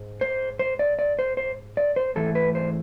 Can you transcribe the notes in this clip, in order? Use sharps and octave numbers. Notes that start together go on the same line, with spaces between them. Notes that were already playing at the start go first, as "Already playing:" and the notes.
Already playing: G#2
C5
C5
D5
D5
C5
C5
D5
C5
G#2 E3 A3 A4
B4
C5